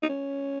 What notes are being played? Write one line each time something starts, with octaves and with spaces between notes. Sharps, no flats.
D#4
C#4